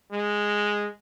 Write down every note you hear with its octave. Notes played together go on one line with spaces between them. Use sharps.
G#3